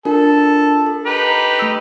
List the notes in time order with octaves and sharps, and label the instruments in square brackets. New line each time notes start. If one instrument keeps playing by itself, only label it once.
[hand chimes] D4 F4 A#4 [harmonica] A4
[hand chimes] A4
[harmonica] D#4 G4 B4
[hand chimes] A3 E6